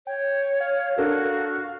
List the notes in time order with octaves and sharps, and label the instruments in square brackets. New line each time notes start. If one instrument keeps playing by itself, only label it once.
[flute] C#5 [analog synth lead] G5
[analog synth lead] F5
[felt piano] D4 A4 A#4 [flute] F#4